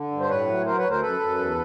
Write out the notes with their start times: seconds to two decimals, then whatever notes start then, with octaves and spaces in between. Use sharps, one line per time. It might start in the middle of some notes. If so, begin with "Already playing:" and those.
Already playing: D3
0.11 G2
0.20 C5
0.29 A2 B4 C#5
0.48 F#3
0.66 F#3 A#4 C5
0.77 B4 C#5
0.84 D2
0.90 A#4 C5
1.02 F#2 A4 B4
1.20 F#2
1.38 E2